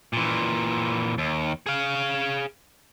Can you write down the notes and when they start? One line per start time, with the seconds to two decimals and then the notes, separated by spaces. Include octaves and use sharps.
0.13 A#2 E3
1.18 D#2
1.66 G#4 F5